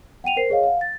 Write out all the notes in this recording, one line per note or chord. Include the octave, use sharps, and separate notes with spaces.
F#5 G5 D#7 F7
A#4 C5 C7
G#4 C#5 D#5 F5
F5 F#5
A6